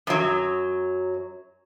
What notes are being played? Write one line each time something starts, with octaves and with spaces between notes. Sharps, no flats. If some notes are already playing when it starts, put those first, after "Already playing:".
F#2 F#3